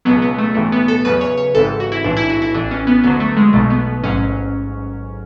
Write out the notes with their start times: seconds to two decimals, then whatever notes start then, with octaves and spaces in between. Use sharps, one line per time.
0.05 C#2 B2 F#3 B3
0.22 B3
0.39 A3
0.54 B1 A2 E3 A3
0.72 B3
0.88 A4
1.05 E2 C#3 F#3 B4
1.21 C#5
1.37 C#5
1.55 G#1 G#2 E3 A4
1.80 F#4
1.92 E4
2.04 B1 A2 E3 D4
2.17 E4
2.30 F#4
2.42 E4
2.54 A1 A2 E3 D4
2.71 C#4
2.87 B3
3.03 D2 D3 F#3 B3
3.20 A3
3.37 G#3
3.53 B1 B2 F#3 A3
3.70 B3
3.86 B3
4.03 A1 G#2 F#3 C#4